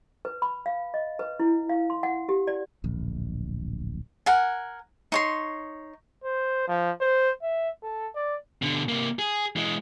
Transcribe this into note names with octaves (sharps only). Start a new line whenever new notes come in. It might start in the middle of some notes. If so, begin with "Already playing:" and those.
B4
B5
F5
D#5
B4
E4
F5
C6
F#5
G4
D5
D1 A#1
A#4 F#5 G#5
D#4 C#5 C6
C5
F3
C5
E5
A4
D5
B2 D3
C3 A#3
G#4
E3 G#3